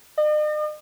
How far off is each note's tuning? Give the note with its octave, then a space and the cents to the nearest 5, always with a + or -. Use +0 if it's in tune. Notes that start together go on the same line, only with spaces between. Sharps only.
D#5 -45